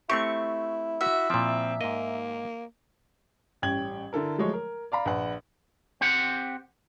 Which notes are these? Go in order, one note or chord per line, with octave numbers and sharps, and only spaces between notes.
A3 C4 E4 G4 C#6
F#4 E5
A#2 F3 C4
G#2 A#3 D#5
A1 G3 C#4 G5 G#6 F#7
D3 E4 A4 A#4
F3 F#3 G#3 A3 C#5
A#4
D5 F5 A#5 B5
A#1 B4 F#5
C4 G4 F#5